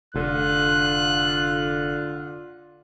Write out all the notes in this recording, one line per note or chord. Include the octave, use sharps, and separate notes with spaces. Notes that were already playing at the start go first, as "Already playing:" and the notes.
F1 D3 F4 F#6